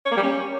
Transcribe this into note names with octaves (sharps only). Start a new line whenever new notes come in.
C#5
A#3
G3
C#4